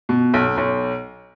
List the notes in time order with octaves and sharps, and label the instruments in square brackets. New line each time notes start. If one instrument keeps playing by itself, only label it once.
[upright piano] B2
B1
B1